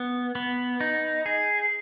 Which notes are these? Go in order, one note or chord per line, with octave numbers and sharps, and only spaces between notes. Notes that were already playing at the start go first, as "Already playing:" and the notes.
Already playing: B3
B3
D#4
G#4